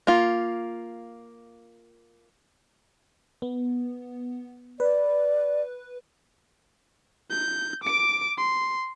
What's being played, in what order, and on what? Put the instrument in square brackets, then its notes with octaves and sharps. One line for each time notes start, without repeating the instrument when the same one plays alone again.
[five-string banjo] A#3 F4
[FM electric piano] B3
[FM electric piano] B4 [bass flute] D5
[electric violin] G6
D6 D7
C6